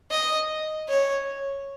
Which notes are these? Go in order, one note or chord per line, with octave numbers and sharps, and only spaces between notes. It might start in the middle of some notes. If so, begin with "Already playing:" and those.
D#5
C#5